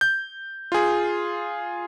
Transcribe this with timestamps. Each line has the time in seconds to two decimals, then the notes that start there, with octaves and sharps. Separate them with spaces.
0.01 G6
0.72 F4 G#4